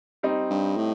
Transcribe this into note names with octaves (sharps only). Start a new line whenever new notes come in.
G3 C4 D#4
G2
A2